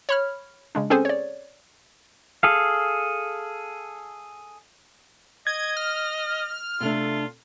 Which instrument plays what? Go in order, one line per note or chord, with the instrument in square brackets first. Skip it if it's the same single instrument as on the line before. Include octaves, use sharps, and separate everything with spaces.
[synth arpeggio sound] C#5 B5 F6
C#3 G#3 D4
C4 C#4 G#4 A4 C5 G#5
C#5 D5
[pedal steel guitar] G#4 A4 F5
[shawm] D#5 [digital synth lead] G#6
[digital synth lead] F6
[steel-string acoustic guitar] C3 A3 D4 [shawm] F4